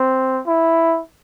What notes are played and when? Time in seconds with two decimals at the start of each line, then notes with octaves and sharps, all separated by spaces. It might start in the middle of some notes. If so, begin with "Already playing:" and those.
Already playing: C4
0.47 E4